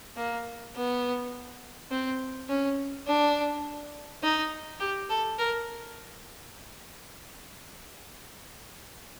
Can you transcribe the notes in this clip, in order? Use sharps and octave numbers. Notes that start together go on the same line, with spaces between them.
A#3
B3
C4
C#4
D4
D#4
G4
A4
A#4